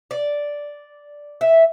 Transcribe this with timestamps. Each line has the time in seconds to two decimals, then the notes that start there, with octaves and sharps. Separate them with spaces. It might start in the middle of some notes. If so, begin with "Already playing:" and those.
0.11 D5
1.41 E5